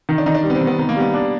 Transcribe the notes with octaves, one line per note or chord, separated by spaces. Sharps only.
D#3
D4
D#3 D#4
D4
G3
B3
C4
D#3
B3
D#3 B3
A#3
G3 B3
D4